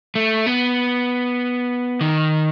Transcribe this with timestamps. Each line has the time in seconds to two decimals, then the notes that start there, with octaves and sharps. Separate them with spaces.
0.15 A3
0.46 B3
2.01 D#3